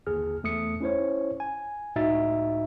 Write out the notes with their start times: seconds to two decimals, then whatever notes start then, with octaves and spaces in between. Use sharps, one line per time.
0.07 G1 D#2 G#4 F6
0.43 E2 A3 D#6 C#7
0.81 C#4 E4 C5 C#5
1.40 G#5
1.96 C#2 A2 D#4 F#4 E5 A6